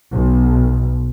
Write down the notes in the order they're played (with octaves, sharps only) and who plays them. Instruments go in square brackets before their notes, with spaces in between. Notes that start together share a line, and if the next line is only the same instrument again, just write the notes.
[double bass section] B1